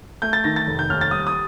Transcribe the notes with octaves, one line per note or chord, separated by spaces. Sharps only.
A3 G6
A6
D#3 A#6
A6
F1
G6
D#2 F6
A6
G3 D#6
D#6